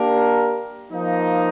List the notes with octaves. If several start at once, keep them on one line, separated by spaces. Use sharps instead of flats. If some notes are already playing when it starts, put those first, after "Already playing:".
Already playing: A#3 D4 G4 A#4
F3 A#3 D#4